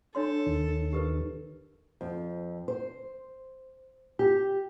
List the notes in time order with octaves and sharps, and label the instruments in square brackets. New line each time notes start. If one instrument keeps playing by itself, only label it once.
[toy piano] D4 C#5 C6 [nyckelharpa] A4
[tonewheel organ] D#2 D#3
[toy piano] G4 A#4 B4
[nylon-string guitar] F2
C5
G4